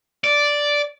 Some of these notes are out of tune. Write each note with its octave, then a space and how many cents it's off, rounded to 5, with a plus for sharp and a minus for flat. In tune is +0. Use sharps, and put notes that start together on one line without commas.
D5 -5